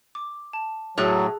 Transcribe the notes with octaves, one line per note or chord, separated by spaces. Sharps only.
D6
A5
A2 F#3 G#4 F#6